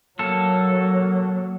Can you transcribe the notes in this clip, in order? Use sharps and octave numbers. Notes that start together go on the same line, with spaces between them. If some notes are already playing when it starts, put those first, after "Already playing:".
F#3 A#3 A4